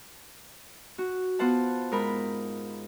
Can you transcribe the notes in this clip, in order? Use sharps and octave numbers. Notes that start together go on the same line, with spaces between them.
F#4
B3 F4 C5 F#5 A5
G#2 A#4 B5